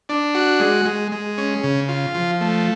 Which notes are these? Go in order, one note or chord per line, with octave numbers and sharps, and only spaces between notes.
D4
F#4
G#3
G#3
G#3
C#4
C#3
F4
F3
A3